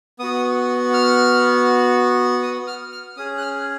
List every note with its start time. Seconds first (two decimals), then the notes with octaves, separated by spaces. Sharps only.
0.19 B3 F#4 D#6
0.94 F6
2.43 D#6
2.67 F6
2.92 F6
3.17 C#4 G#4 D#6
3.38 F#6
3.42 F6